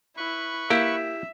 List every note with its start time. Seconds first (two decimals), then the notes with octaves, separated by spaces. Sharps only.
0.17 E4 B4 C#6
0.70 A#3 E4 G4 E5